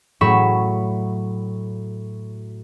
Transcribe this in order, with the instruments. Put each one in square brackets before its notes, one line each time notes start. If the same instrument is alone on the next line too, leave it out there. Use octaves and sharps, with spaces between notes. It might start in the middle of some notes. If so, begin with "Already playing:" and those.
[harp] A2 F#3 C#5 B5 C#6 E7